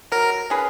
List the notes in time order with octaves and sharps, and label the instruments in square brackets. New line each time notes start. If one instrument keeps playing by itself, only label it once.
[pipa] F#3 [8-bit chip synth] A#4
[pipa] C#4 G#4 B4